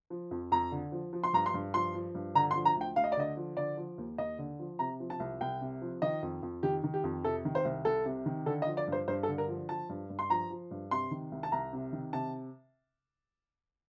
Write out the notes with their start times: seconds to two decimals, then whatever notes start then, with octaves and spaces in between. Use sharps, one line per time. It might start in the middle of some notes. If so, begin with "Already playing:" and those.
0.10 F3
0.31 F2
0.52 F2 A#5
0.72 D3
0.92 F3
1.13 F3
1.24 C6
1.33 G2 A#5
1.46 C6
1.54 G2
1.74 F3 C6
1.94 F3
2.15 G2
2.35 D3 A#5
2.51 C6
2.55 F3
2.65 A#5
2.76 D2 G5
2.96 D2 F5
3.04 D#5
3.12 D5
3.17 D3 D#5
3.37 F3
3.57 D3 D5
3.77 F3
3.98 D#2
4.18 D#2 D#5
4.39 D3
4.59 F3
4.79 C3 A#5
5.00 F3
5.10 A5
5.20 C2
5.41 C2 G5
5.61 C3
5.82 F3
6.02 D#3 D#5
6.23 F2
6.43 F2
6.63 D#3 G4
6.84 D#3
6.94 G4
7.04 F2
7.24 C3 A4
7.45 D#3
7.55 C5
7.65 C2
7.85 C2 A4
8.05 C3
8.26 D#3
8.46 D3 A4
8.62 D#5
8.66 F3
8.77 D5
8.87 G2 C5
9.08 G2 C5
9.23 A4
9.28 D3
9.38 A#4
9.48 F3
9.69 F3 A5
9.89 G2
10.10 G2
10.19 C6
10.30 F3 A#5
10.50 F3
10.71 G2
10.91 C3 C6
11.11 D#3
11.32 C2
11.43 A5
11.52 C2 A#5
11.73 C3
11.93 D#3
12.13 C3 A5